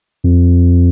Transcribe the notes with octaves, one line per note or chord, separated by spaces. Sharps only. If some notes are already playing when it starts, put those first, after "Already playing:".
F2